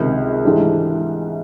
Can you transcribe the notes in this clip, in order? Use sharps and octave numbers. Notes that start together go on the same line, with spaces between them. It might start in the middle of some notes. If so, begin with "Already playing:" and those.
Already playing: C#2 C3 D#3
G#2 E3 A3 D4 G4